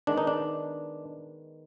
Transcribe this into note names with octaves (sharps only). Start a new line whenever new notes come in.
D#3 G#3 B3 D4
D#4
D4